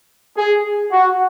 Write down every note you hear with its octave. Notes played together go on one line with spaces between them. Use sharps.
G#4
F#4